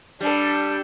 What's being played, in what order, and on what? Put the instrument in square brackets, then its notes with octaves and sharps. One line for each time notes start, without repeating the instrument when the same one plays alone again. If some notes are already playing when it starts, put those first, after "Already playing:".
[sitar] G3 [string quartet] D4 A4